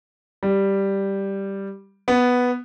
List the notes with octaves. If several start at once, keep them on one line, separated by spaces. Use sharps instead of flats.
G3
B3